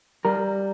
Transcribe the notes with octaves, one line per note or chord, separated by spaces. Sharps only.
G3 A#4